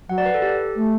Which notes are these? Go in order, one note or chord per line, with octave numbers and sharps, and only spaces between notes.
F#3 F#5
D5
B4
A4
G4
A3